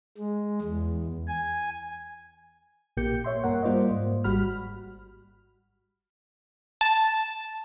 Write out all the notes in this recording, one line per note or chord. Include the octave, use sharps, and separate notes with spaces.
G#3
E2
G#5
A#1 A#2 A#3 G4 G6 C#7
C#5 E5 C6
G2 A#3 A#4 F#5
G3 A#3 F4 C5 D5 D#5
G#2
G#1 G3 F#4 F#5 B5 F6
A5